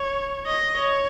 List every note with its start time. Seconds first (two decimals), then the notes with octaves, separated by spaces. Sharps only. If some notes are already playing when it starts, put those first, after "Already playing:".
Already playing: C#5
0.46 D#5
0.76 C#5